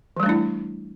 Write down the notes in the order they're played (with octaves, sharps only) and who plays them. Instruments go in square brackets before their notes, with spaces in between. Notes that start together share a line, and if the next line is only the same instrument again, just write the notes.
[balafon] E3
G3
A3
D4
E4